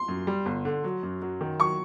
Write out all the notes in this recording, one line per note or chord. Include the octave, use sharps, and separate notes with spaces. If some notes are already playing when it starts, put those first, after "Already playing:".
Already playing: C6
F#2
G3
G1
D3
F#3
F#2
F#3
D#3
F#3 C#6